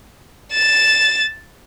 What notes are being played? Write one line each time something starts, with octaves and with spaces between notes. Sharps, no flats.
A6 E7